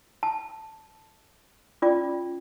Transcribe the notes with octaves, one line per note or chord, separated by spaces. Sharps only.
A5
C#4 F4 D5 D6